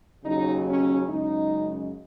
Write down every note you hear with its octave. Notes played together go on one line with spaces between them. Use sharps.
D#2 C#3 F#3 D#4
C#4
F#2 C#3 G#3 D#4